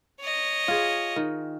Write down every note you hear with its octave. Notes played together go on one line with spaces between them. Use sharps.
C#5 D#5
F4 G#4
D#3